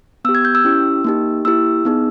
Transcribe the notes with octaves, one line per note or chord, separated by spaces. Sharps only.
B3 G4 E6
G#6
G6
E6
C#4 E4 G4
A#3 D#4 G4
A#3 E4 G4 E6
B3 D#4 G#4